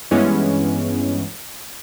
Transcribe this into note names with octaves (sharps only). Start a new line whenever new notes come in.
G2 E3 G#3 B3 C#4